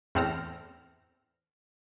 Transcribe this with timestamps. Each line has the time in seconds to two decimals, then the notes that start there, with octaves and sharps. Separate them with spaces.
0.15 E2 A2 C4 A4 F6 A#6